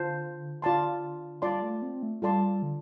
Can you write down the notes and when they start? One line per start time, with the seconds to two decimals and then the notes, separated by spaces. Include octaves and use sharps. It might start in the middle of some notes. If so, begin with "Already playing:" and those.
Already playing: D3 F4 C5 A5
0.62 F4 D5 A5 C6
1.42 G3 F4 D5 A5 C6
1.62 A3
1.82 C4
2.03 A3
2.22 G3 F4 A4 D5 A5 C6
2.62 D3